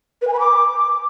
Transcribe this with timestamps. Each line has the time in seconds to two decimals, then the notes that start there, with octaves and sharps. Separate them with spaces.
0.22 B4
0.27 G#5
0.33 B5
0.39 D6